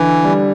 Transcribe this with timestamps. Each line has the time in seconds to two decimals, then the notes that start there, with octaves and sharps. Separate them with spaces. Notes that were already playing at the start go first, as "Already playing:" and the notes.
Already playing: D3 E3
0.24 G3